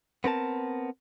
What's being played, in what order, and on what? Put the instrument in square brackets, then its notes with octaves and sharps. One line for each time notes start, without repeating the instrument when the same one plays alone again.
[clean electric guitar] B3 C4 A#4 A5